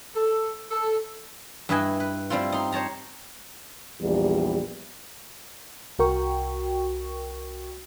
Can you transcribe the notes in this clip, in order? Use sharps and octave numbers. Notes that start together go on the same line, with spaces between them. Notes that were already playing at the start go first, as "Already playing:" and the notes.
A4
A4
G2 E4 B4 D#5 E5 G#5
B4
G3 C4 E4 F4
D#4 C6
C5 C#5 A5 A#5
A#1 E2 G3
C2 F#4 A#4 G5 C#6